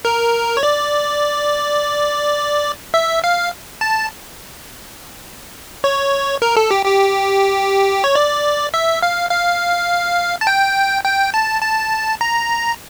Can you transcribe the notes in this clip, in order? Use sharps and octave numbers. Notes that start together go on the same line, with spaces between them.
A#4
C#5
D5
E5
F5
A5
C#5
A#4
A4
G4
G4
C#5
D5
E5
F5
F5
A5
G5
G5
A5
A5
A#5